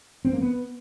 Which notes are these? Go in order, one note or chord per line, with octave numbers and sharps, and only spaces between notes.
C4
A#3
B3